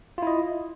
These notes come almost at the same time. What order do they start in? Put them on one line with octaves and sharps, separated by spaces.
F4 E4 D#5